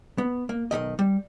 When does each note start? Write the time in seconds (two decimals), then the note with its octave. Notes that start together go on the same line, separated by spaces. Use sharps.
0.18 B3
0.49 A#3
0.71 B1 G2 D#3 D#5
0.99 G3